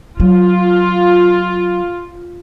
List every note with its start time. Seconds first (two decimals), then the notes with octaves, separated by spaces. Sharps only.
0.20 F#3 F4